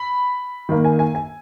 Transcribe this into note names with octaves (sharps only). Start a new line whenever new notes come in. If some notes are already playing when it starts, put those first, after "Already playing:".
Already playing: B5
D#3 A#3
G#5
G#5
G#5